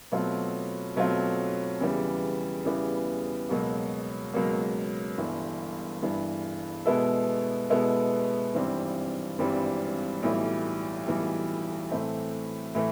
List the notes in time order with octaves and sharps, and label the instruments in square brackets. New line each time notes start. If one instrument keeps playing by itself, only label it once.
[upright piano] B2 F#3 A3 C4 F4
B2 F#3 A3 C4 F4
E2 C#3 E3 G3 B3
E2 C#3 E3 G3 B3
C#2 B2 F#3 A#3
C#2 B2 F#3 A#3
G1 G2 E3
G1 G2 E3
B2 G#3 B3 E4 A4
B2 G#3 B3 E4 A4
G#1 G2 E3 G3 C4
G#1 G2 E3 G3 C4
B1 A2 E3 G3
B1 A2 E3 G3
A2 E3 A3 C4
A2 E3 A3